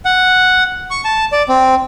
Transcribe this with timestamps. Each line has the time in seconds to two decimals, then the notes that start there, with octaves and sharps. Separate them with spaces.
0.05 F#5
0.91 C#6
1.05 A5
1.32 D5
1.49 C4